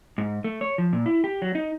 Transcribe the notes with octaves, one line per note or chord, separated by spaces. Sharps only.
G#2
A3
C#5
F3
A#2
E4
G4
F#3
D#4